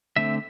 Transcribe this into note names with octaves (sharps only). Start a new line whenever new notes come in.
D3 A3 C4 E5